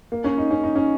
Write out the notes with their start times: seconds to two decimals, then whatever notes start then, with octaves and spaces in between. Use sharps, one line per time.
0.12 A#3
0.24 C#4
0.38 D#4
0.51 C#4
0.63 D#4
0.76 C#4